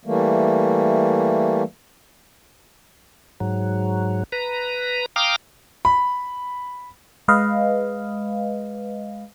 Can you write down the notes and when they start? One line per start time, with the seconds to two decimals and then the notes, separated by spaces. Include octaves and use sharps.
0.05 E3 G3 A3 A#3
3.40 G#2 F#3
4.32 B4 A#5
5.16 F5 G5 A#5 D6 D#6 F6
5.85 B5
7.28 G#3 B4 D#5 F5